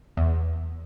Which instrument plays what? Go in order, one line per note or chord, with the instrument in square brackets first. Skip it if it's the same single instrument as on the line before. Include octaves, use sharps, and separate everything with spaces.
[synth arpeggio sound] E2